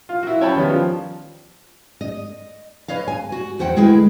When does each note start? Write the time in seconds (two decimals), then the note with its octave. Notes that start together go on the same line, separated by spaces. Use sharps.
0.09 F4
0.23 E4 F#4
0.41 C#4 C#5 F5 G5 A5 B5
0.56 D#3 G3 B3 C#4
0.71 F3
2.01 D#5
2.88 B4 C#5 D#5 F5
3.08 G#5
3.32 F#4
3.59 E2 F#4 C5 F#5 G5
3.76 D2 G#3 E4 G#4 B4 G5